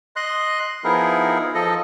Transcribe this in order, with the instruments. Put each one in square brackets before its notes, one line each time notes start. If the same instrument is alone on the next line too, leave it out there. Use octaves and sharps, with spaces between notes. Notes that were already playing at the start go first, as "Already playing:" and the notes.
[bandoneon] D#5 C6 F#6
F3 B3 D#4 E4 G#4 A#4
F3 A4 D#5